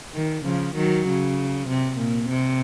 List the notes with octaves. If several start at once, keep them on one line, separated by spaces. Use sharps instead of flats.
D#3
C#3 F3
D#3 F#3
C#3
C3
A#2
C3